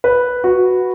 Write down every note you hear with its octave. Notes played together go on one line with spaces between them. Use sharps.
B4
F#4